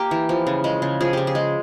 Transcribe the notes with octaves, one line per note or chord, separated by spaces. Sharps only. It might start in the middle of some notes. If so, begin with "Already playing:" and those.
Already playing: A#3 G4
E3
F3
C#3
G#3
C#3
F3 G#4
C#3 G4
G#4
G#3